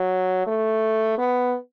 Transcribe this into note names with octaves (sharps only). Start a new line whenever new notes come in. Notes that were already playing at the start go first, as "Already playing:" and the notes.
Already playing: F#3
A3
B3